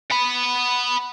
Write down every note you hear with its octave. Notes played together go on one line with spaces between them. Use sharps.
F#5 B5